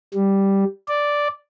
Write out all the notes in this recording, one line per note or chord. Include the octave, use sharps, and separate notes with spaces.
G3
D5